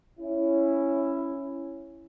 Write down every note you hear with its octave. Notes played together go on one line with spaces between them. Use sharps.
C#4 E4